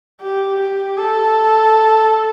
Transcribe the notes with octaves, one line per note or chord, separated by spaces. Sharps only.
G4
G4
A4